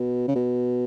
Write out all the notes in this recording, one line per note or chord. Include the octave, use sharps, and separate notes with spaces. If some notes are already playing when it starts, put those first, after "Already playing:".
Already playing: B2
C#3
B2